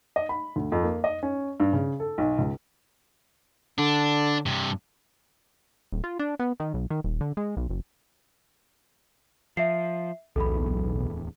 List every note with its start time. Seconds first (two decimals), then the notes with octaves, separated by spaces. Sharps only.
0.16 D#5
0.29 B5
0.56 D2
0.72 F2
0.84 A#3
1.04 D#5
1.23 C#4
1.60 G2
1.73 C#3
2.00 A4
2.18 B1
2.38 C#2
3.78 D3 D4
4.46 G2 C3
5.92 D#1
6.04 F4
6.19 D4
6.39 B3
6.60 D#3
6.74 B1
6.90 D#3
7.04 D#1
7.21 D3
7.37 G#3
7.57 B1
7.70 F#1
9.57 F3 E5 C7
10.36 D1 B1 E2 A4 B5